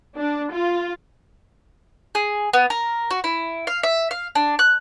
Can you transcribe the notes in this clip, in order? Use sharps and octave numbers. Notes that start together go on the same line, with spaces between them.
D4
F4
G#4
B3
A#4
F#4
E4
F5
E5
F5
D4
F#6